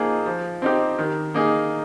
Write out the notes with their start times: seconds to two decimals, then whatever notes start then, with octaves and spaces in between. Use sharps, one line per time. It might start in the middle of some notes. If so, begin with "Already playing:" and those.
Already playing: F3 A#3 D#4 G#4
0.26 F3
0.62 C4 D#4 G4
0.99 D#3
1.34 A#3 D#4 G#4